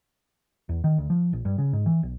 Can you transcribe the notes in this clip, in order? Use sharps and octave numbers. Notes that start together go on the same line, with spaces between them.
E2
D#3
D2
F3
A#1
G2
C#3
G#2
E3
B1